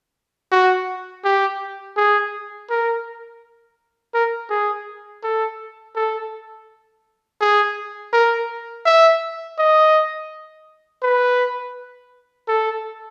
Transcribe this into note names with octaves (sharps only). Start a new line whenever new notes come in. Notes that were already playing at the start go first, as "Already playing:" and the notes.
F#4
G4
G#4
A#4
A#4
G#4
A4
A4
G#4
A#4
E5
D#5
B4
A4